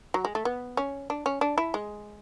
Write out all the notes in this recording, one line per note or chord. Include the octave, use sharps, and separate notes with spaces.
F#3
G#3
A3
B3
C#4
D4
C#4
D4
E4
G#3